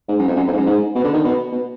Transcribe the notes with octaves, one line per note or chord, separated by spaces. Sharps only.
G#2
F#2
F2
F#2
F2
G#2
F#2
G#2
B2
D3
D#3
B2
B2